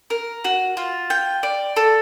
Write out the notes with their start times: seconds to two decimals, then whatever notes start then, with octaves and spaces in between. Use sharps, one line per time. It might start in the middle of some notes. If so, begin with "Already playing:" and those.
0.10 A#4
0.44 F#4
0.77 F4
1.10 G5
1.43 D5
1.76 A4